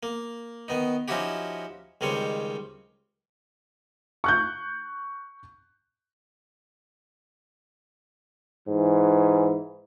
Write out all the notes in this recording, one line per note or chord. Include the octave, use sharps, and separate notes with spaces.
A#3
D#3 B3 D#4
F3 C#4 D#4 E4 F#4 G4
C#2 D#3 G3 C4 C#5
C#6 F#6 G6
G#2 E3